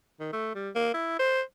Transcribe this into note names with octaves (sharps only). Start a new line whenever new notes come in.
D#3
A3
G3
A#3
E4
C5